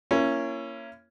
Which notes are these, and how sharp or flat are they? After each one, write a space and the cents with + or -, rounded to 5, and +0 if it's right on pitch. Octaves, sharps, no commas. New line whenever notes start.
A#3 +0 C#4 +0 E4 +35